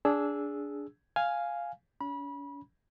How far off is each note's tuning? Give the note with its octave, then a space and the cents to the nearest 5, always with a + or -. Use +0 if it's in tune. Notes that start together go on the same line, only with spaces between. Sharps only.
D4 -15 G#4 +0 E6 +0
F5 +0 G#5 +0
C#4 +45 B5 -30